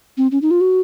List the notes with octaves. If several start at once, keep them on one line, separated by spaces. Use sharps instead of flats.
C4
C#4
D#4
F4
F#4